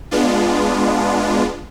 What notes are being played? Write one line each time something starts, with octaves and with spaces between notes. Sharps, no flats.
G#3 B3 D4 F4